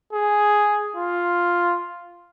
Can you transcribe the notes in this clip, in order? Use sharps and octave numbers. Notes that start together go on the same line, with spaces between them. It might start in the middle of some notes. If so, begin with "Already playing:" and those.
G#4
F4